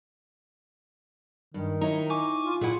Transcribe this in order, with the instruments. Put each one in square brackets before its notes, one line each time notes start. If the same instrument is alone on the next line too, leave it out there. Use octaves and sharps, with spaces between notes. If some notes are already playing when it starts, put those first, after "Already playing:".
[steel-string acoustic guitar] G2 [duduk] D#3
[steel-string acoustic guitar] D#4 E4 C#5 [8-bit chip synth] A#5
[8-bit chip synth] G#5 C#6 D6
[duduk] F4
[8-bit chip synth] A#2 E4 [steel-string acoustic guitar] G#4 F#5